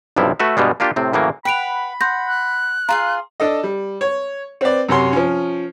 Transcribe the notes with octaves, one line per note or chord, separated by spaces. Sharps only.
B1 G2 C3 F3 E4
A3 F#4 B4 E5
G2 B2 G3 G#3
A#3 D4 F4 G4
A2 C3 C4
A2 C#3 E3 F#3 A#3
B4 F#5 G5 B5 D7 F7
F#5 C6 G6 A#6
F#6
F4 G#4 F5 A#5 C6
D4 A4 D#5
G3
C#5
C4 B4 D5
F#2 C3 C#4 C6
F3 C#4